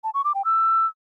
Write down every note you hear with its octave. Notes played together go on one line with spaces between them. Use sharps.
A5
C#6
D6
G5
E6